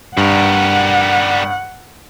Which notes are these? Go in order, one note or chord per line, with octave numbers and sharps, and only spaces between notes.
G2 G3 A#4 F#5